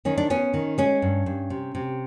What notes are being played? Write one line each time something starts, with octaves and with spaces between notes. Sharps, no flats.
D#3 C#4
D4
B3 C#4
D#3
G#3 C#4
G2
G2
C3
C3